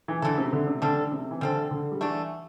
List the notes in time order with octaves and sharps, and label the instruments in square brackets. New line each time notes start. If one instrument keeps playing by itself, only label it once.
[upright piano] E3
[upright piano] D3 [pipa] E3 A3 E4 A4
[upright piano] C3
D3
C3
[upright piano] D3 [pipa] G3 D4 A4
[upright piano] D3
C3
E3
[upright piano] D3 [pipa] G3 C4 A4
[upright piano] D3
G3
[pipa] D3 A3 D4 [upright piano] E3